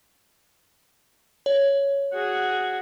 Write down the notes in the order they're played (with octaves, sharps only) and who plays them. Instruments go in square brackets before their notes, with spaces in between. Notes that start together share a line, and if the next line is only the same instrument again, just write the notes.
[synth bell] C#5
[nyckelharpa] F#4 G#4